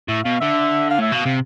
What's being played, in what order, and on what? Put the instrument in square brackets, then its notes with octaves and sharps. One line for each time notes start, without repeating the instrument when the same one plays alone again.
[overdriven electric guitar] A2 [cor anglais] E5
[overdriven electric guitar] B2 [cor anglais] F5
[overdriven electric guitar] D3 [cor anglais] E5
[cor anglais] F5
[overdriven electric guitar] A2 [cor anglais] E5
[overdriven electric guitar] B2 [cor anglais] F5
[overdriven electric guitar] C3